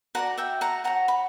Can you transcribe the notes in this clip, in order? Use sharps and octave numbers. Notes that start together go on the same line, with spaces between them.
F#4 B4 D5 F#5 A#5
E5 G5
F#5 A#5
F#4 C#5 F#5 A#5
B5